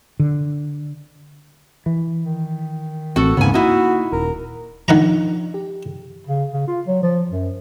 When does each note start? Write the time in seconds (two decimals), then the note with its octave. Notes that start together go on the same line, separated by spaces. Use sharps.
0.20 D3
1.86 E3
2.24 D#3
3.16 A1 C4 F#4 A4
3.37 D#2 G#2 C#3 A#3 B3 G#5
3.54 A#3 D#4 E4 F#4
4.12 D#1 A#4
4.88 D#3 F3 D4 D#4 F#5 A#5
5.54 G4
6.27 C#3
6.53 C#3
6.67 F4
6.87 F#3
7.03 F3
7.29 F#2